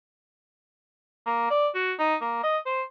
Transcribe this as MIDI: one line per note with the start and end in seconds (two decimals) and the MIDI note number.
1.26 1.46 58
1.50 1.68 74
1.75 1.92 66
1.99 2.15 63
2.21 2.42 58
2.43 2.58 75
2.66 2.82 72